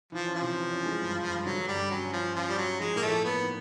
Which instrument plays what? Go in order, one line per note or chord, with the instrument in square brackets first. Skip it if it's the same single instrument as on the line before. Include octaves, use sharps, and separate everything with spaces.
[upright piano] E3 [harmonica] F3
[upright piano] C#4
[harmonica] F3
[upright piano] C3
E3
C#4
G#3
G2
G2
G2
[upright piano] D3 [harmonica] F#3
[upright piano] G2
[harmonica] G3
[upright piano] G2
[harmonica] F#3 [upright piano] C#4
[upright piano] C#4
[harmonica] F3
[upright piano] C#4
[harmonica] F3 [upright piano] C#4
[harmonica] G3 [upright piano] C#4
[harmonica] F#3
[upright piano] C#4
[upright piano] F3 [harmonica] G#3
[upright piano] A2 [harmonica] A#3
[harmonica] A3
[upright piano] F3
[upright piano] A#3 [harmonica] B3
[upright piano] D#4